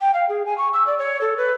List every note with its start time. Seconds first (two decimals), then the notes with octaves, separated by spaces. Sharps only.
0.01 G5
0.14 F5
0.29 G#4
0.46 G#5
0.58 C#6
0.73 E6
0.87 D5
0.99 C#5
1.21 A4
1.37 B4